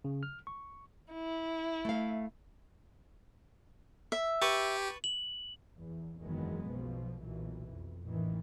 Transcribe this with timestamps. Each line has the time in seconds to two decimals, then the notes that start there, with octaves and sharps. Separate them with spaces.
0.04 C#3
0.23 F6
0.47 C#6
1.12 E4
1.85 A3 F5
4.12 E5
4.42 G4 B4 A5 C#6
5.04 F#7
5.77 E2
6.20 F#1 E2 D#3 F#3 G#3 B3
6.68 B1 B2 F3
7.22 B1 A#2 E3
7.69 F2
8.06 A1 A#2 D#3 E3